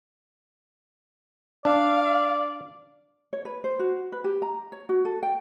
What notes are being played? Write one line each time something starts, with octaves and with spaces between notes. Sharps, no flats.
D4 D5 F5
C#5
B4
C5
F#4
B4
G4
A#5
C#5
F#4
A4
G5